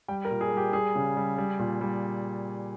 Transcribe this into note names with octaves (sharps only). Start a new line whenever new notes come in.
G3 G5
A#4
A#2
G#4
G3
G4
G3 G#4
C#3
G3
G3
A#2
G3